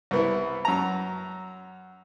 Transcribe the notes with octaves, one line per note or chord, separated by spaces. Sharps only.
C2 B3 E4
F#2 A#5